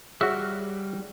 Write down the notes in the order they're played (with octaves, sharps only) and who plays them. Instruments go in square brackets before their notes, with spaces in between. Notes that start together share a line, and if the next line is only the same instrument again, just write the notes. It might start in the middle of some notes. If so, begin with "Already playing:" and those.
[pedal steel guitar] G3 F6 F#6 [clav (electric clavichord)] F#4 E5 [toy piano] G#4 C#5